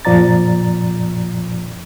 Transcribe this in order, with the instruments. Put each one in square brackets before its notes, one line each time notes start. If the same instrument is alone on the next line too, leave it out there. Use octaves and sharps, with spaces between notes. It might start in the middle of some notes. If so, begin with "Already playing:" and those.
[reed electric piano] F#2 A#2 F3 D5 A#5 A6